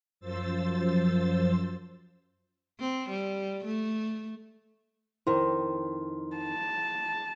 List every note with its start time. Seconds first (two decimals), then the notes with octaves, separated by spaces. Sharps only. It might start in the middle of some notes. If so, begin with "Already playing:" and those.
0.20 F#2 F3 C5 E6 A6
2.79 C4
3.10 G3
3.65 A3
5.27 F2 D#3 E4 C6
6.36 A5